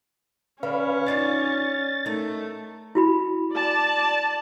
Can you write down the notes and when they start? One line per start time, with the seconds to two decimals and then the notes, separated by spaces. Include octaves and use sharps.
0.63 D3 C#4 B4 F5
1.07 D4 D#4 F4 A6
2.06 A3 D#4 A#4
2.95 E4 F#4 B5
3.55 D5 A5